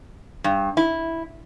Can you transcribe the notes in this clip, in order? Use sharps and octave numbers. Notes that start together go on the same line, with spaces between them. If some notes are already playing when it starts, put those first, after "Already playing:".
G2
E4